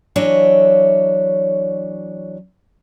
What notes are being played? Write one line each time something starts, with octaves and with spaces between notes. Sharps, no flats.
E3 F#3 D4 C#5 D#5 E5